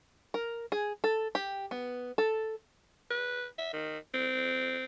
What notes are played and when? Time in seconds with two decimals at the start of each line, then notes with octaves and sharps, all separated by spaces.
0.34 A#4
0.72 G#4
1.04 A4
1.35 G4
1.71 B3
2.18 A4
3.10 B4
3.58 E5
3.73 D#3
4.14 C4